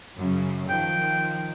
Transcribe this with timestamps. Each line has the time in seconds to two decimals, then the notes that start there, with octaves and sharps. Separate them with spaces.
0.17 F#2 C#3
0.69 D#3 F3 G5